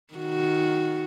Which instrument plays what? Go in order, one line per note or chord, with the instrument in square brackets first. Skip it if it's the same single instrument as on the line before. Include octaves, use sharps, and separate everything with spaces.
[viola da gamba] D#3 F#4